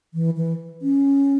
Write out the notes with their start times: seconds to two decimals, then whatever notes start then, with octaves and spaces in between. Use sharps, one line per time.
0.14 E3
0.37 E3
0.82 C#4